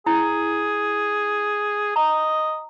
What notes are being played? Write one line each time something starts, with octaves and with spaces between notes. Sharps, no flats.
E4 G#4
D#5 A#5